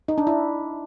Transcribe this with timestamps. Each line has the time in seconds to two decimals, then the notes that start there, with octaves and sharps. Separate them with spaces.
0.08 D#4
0.18 D4
0.27 E4